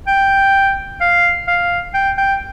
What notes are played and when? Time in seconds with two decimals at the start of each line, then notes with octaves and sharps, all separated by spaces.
0.07 G5
1.01 F5
1.47 F5
1.94 G5
2.18 G5